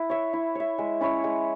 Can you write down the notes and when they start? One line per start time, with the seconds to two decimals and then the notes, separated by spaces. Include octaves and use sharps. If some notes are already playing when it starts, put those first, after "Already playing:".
Already playing: E4 B4
0.10 C#5 E5
0.33 E4
0.55 C#5 E5
0.78 G#3
1.01 C#4 E4 C#5
1.24 G#3